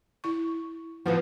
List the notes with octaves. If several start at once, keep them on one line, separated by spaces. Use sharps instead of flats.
E4 C#6
E3 F3 B3 F#4